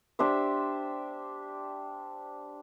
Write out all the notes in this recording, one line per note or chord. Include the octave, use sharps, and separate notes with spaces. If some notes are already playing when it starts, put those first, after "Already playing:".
D4 G4 C5 E5